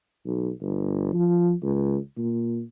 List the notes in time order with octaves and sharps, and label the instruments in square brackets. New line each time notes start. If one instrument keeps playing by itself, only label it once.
[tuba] B1
G1
F3
C#2
A#2